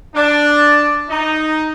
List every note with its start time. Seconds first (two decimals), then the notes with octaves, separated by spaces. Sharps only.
0.15 D4
1.10 D#4